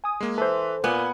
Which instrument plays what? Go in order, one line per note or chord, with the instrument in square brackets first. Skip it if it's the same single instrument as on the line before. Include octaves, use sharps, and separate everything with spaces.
[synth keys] G#5 D#6
[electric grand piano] G#3 A#3
[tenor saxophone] E3 [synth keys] A4 C5 [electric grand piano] B4
[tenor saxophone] A#2 [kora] B3 [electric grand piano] F#5 G#5 D6